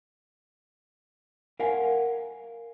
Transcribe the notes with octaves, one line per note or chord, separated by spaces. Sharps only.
A#4 F5 F#5 G#5